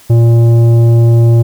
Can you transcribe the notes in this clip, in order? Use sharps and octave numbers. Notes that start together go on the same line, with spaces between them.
A#2